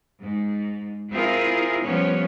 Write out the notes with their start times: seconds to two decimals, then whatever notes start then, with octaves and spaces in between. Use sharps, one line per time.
0.21 G#2
1.10 C4 E4 F4 G#4 A#4
1.82 F3 G3 B3 C#4 C#5